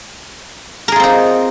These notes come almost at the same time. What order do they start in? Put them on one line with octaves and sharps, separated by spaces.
A#4 G#4 F4 C4 D#4